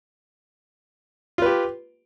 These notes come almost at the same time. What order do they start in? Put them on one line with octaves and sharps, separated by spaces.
F4 B4 G4